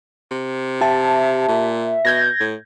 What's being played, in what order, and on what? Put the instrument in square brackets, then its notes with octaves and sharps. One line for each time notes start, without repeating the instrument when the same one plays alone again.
[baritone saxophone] C3
[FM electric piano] G4 A5 [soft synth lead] E5
[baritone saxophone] A#2
[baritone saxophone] B2 [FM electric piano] G6 G#6 A#6
[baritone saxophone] A2